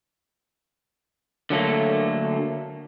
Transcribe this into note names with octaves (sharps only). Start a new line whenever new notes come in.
D3 F#3 A3 A#3